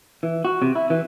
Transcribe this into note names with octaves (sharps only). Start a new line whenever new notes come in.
E3
F#4
C3
E4
E3